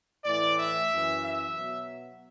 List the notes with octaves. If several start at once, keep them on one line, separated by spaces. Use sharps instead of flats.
A2 E3 D5
E5
F#2 E3
E5
B2 F#3